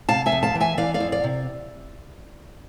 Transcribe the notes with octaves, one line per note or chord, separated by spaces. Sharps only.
C3 F5 A5
E5 G#5
F2
F5 A5
E3
E5 G#5
E3 D5 F5
D5 F5
F2
D5 F5
C3